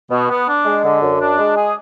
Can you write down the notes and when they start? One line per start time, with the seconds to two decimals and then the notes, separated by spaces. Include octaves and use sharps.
0.10 B2
0.29 B3
0.47 D4
0.65 G#3
0.84 D3
1.02 F#2
1.20 D4
1.38 G#3
1.56 G#4